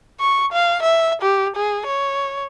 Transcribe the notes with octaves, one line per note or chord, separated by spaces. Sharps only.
C#6
F5
E5
G4
G#4
C#5